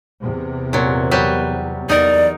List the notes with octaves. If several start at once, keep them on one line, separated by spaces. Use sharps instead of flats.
E2 C3
A#2 F#3
F#3 G3 B4
E2 D#4 A#4 D5